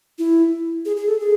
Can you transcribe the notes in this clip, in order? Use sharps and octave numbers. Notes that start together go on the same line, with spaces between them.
E4
G#4
G#4
A4
G#4